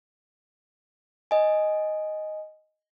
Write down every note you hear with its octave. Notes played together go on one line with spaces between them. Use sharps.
D#5 G#5